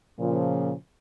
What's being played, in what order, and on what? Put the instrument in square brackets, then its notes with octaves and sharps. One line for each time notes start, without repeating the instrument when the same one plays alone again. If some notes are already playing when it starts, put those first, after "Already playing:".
[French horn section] A#2 C#3 F3